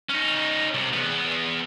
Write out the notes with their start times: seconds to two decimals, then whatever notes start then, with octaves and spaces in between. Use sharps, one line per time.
0.10 C#4 D#4
0.74 C2 C3
0.94 E2 B3